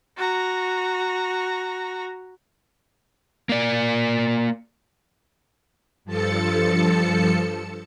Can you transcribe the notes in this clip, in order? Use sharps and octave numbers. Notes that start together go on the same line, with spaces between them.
F#4 A#5
A#3 D5
G2 F3 A4 A5 C#7